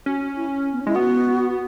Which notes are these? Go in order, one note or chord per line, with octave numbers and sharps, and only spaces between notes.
C#4 F#4
E4
B3
C#4
G#3 E4
B3 F#4